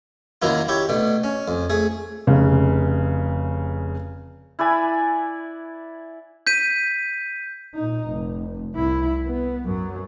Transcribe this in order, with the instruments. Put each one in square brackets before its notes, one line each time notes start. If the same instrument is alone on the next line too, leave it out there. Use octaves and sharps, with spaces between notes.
[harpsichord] F#2 D#3 F#3 A#3 E4 F4
E4 G4 C#5
B2 A3 D4
C#4
F2
A3 G#4
[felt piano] F1 C#3
[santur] E4 B4 D5 G#5
[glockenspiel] G6 B6 D#7
[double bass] A#2 D#4
F1
C2 E4
B3
F#2 F#3